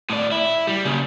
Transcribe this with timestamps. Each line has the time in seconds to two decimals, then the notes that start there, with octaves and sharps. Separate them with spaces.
0.10 A2 D5
0.32 E4
0.67 G3
0.85 C#3 A#3